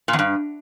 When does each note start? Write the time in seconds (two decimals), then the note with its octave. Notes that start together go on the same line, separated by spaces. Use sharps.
0.08 A#2
0.13 E2
0.19 G2